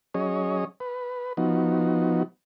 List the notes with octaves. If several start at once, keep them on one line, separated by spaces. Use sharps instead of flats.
F#3 C#4 G#4 C#5 D#5
B4
F3 B3 D#4 F#4